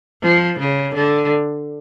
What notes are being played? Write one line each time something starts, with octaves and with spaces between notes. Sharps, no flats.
F3
C#3
D3